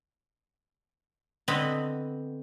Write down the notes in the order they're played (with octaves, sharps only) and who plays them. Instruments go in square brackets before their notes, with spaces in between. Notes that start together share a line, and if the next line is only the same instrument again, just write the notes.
[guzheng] D3 B3 C4 D#5 A5 B5